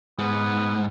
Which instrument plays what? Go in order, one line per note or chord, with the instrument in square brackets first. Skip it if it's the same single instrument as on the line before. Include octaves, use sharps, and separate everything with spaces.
[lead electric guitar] G#2 [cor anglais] B3